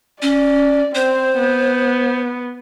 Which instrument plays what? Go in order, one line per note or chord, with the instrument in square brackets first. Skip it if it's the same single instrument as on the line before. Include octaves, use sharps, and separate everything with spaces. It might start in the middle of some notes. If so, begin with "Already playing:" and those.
[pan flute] C#4 [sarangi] D5
[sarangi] C4 [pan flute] C5
[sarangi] B3